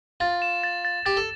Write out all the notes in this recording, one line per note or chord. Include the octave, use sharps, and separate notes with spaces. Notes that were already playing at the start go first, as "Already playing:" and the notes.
F4 A6
E7
A6
A6
G4 A6
A4